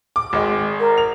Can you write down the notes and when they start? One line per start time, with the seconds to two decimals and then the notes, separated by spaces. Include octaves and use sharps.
0.16 D6
0.33 G#1 G#3 G5
0.79 A#4
0.97 F7